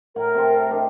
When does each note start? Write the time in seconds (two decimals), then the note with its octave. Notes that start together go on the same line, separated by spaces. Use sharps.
0.16 A2 A#4 F#5
0.35 C3 A5 C6
0.70 D4 D#4 G4